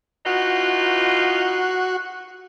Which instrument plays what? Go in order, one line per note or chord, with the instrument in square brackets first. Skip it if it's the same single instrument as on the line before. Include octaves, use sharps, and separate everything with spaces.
[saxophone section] E3 D#4 F4 [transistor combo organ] F#4